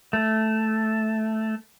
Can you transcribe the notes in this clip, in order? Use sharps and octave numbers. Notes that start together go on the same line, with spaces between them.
A3